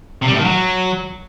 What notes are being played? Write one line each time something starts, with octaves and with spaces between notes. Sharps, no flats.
C3
G3
A2
D#3
F#3